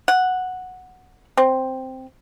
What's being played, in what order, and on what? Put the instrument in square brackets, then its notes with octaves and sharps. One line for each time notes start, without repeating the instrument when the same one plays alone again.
[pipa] F#5
C4